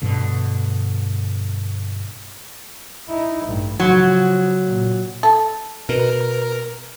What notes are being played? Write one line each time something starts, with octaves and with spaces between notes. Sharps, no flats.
G2 B2 D3
D#4 E4
A1 G2
C#3 F3 F#3
A#2
A4
B2 A#4 B4